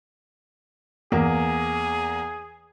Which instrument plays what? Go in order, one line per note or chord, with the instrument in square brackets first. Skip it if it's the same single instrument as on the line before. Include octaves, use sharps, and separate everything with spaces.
[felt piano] E2 A#3 [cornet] G#4